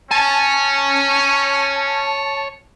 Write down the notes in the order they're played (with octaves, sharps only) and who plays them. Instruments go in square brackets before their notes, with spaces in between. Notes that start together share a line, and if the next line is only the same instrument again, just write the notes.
[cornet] C#4 [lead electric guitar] C#5 G#5 [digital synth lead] A5